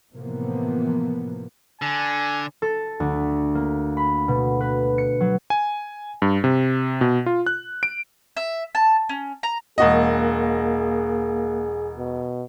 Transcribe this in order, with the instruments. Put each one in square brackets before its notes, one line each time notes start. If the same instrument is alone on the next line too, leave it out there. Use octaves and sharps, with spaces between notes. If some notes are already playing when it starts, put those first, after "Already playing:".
[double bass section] A2 C3 E3 F3 A#3 B3
[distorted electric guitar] D3 [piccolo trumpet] G#5
[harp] A4
D2
A#3
B5
B2
B4
C#7
F#3
[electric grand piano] G#5
G2
C3
B2
F4
F#6
D7
[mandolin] E5
A5
C#4
A#5
[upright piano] E1 F#4 D#5 [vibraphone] A#3 A#4 F5 [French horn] G#4
[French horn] B2